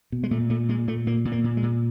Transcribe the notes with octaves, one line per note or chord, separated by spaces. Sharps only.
B2
G#3
A#2 A3
A#2 A3
A#2 G#3
A#2 A3
A#2 A#3
A#2
A#3
A#2
G#3
A#2